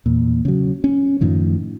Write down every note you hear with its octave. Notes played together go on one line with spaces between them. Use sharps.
E2 A#2
C#3 F#3
C#4
F#2 A2 D#3 F3